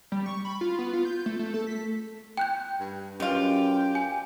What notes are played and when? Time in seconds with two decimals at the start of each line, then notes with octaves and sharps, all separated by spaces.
0.12 G3
0.26 C#6
0.45 B5
0.61 F4
0.79 B3
0.93 F4
1.05 G6
1.26 A3
1.39 A3
1.54 A4
1.67 B6
2.37 G5 F#6 G6
2.80 G2
3.20 F#2 B2 F4 G4
3.95 G#5